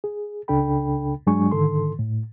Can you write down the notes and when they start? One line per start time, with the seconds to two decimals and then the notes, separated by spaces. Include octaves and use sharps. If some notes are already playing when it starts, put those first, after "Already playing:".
0.04 G#4
0.48 C#2 C#3 D4 A4 G5 B5
1.27 G2 F#3 G#3 D4 G#5 C#6
1.51 G#2 D3 D#3 A4 C6
1.99 A2